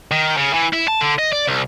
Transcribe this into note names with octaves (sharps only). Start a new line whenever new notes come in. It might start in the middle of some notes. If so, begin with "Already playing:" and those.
D#3
C#3
E3
E4
A5
D3
D#5
D5
C2